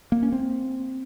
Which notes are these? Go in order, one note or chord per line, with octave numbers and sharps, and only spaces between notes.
A#3
C#4
C4